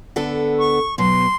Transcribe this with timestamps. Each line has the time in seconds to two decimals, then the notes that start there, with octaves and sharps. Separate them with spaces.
0.16 D3 B3 A4
0.59 C#6
0.98 B2 F#3 C6